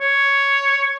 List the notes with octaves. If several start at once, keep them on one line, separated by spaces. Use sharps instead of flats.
C#5